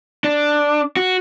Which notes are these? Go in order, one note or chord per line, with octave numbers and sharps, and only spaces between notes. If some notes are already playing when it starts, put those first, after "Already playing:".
D4
F#4